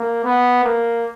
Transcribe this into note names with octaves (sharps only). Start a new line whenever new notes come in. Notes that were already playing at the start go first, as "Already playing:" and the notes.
Already playing: A#3
B3
A#3